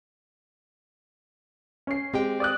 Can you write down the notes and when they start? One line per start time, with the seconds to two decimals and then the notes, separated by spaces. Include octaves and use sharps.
1.87 C#4 C7
2.14 G#3 C4 G4 G5
2.40 D5 D#6 F#6